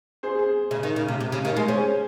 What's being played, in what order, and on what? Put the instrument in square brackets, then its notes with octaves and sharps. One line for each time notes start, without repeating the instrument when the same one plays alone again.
[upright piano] G#4 C5
G#4
[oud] C#3
D#3
C#3
C3
C3
C#3
D#3
G#3
[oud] C#4 [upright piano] G#4 C5